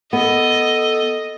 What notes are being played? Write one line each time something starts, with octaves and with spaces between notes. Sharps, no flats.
B3 A4 D#5